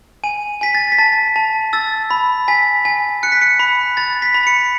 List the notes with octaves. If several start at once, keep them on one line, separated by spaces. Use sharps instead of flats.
G#5 D#7
G#5 B6
A6
B6
A5 A6
A5
E6 A6
B5
G#5 B6
G#5
F#6 C#7
B6
C#7
B5
B5 A6
B6
B5
C#7